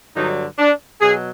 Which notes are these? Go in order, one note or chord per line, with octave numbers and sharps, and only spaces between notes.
G2 D3 F#3 D#4
D4
B2 F#3 G#4